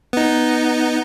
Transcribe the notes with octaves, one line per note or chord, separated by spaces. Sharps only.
B3 D#4